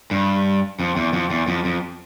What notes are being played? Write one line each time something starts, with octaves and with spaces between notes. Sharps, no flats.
G2
F2
E2
F2
E2
F2
F2